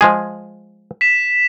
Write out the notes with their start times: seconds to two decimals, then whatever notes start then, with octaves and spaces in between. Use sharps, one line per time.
0.01 F3 G#3 G#4
1.01 B6 E7